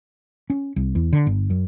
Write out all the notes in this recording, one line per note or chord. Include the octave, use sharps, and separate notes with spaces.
C#4
C2
E2
D3
G1
F#2